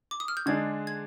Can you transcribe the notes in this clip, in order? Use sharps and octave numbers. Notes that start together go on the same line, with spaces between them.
D6
D#6
F6
G6
D3 G#3 D4 G#4 G#6
G#6